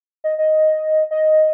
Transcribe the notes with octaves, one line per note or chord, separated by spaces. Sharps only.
D#5
D#5
D#5